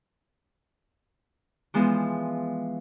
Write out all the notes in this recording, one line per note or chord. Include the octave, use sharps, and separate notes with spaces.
E3 F3 G#3 B3